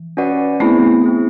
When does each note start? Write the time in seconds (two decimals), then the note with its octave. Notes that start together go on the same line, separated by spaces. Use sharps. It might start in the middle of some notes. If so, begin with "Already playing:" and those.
Already playing: E3
0.17 C#4 F#4 B4 D5 F#5
0.60 A3 B3 C4 E4 G#4
1.04 C4 E4 G#4